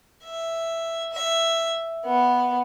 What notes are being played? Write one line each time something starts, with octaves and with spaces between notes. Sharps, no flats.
E5
E5
B3